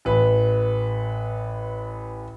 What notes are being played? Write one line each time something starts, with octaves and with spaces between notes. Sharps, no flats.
A1 B4